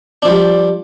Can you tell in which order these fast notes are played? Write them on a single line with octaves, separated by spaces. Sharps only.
D4 F3 G3